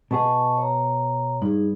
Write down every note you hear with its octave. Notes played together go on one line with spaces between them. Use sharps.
B2 B3 G#4 D#5 A5 C#6
C#5 A#5
G2 D#4 G#4